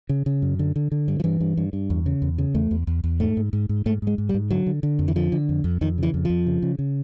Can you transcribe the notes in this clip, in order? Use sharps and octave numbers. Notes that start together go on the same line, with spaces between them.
C#3
C#3
F#2
D3
D3
D3
G2
F3
G2 E3
G2
G2
G2
E2
C#3
E2
C#3
E2 A3
E2
E2
E2
G#2 A3
G#2
G#2
G#2
G#2 A3
G#2 G#3
G#2
G3
G#2
D3 F#3
D3
D3
F2
E3
D3 F3
D3
F2
F2
F2 D#3
C#3 E3
F2
F2 F3
C#3
C#3
C#3